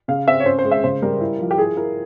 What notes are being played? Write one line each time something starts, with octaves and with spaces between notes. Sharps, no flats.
C#3 F5
C4 E5
C#5
C#4 C5
C5
G#3
E5
C#3 C5
G3 A#4
E4
F3
G4
E4 G#4
E4 A#4